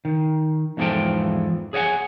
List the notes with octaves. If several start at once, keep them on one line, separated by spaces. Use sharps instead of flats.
D#3
E2 G#2 E3 F3 A4 G5
G#4 C#5 D#5 F#5 G#5